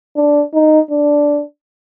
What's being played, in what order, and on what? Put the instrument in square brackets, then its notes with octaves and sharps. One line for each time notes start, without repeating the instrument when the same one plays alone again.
[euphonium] D4
D#4
D4